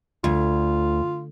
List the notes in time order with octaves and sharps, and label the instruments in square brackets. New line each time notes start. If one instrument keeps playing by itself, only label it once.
[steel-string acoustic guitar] D2 [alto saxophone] F4